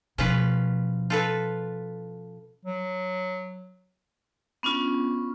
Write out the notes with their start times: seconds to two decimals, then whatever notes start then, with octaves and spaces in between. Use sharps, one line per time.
0.18 B2 F3 C#4 F4 B4
1.10 F4 A4 B4
2.65 F#3
4.63 B3 C#4 D4 F4